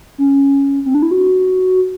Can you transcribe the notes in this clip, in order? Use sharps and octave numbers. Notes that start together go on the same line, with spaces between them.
C#4
C4
D4
E4
F#4